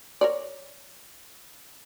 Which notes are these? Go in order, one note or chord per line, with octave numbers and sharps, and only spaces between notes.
A#4 C#5 D5